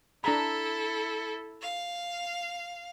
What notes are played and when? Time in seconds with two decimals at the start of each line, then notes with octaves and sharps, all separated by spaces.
0.24 D4 E4 A4 A#5 B5
1.62 F5